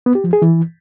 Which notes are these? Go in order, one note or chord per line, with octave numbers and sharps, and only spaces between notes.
B3
G4
F3
G#4
E3